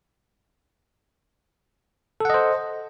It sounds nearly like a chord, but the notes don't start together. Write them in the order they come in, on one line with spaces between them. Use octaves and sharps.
A4 F#5 D#5 C5